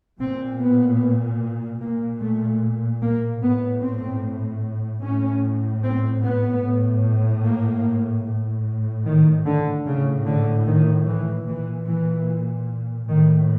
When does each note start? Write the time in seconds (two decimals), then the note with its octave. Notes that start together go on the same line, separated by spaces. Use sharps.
0.19 A#2 C4
0.60 B3
1.81 A#2 A#3
2.22 A3
3.02 A#3
3.41 A2 B3
3.82 C4
5.02 A2 C#4
5.83 C4
6.23 B3
6.64 A2
7.45 A#3
8.25 A2
9.05 D#3
9.46 D3
9.86 A2 C#3
10.26 D3
10.66 D#3
11.07 E3
11.47 A#2 E3
11.87 E3
13.08 A2 D#3